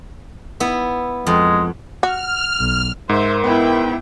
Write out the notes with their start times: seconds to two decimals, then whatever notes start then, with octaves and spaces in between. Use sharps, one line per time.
0.60 B3 E4
1.27 F2 G#3
2.03 F#4 F6
2.59 B1
3.09 G#2 A#4 C5 E5
3.44 B3 E4 G5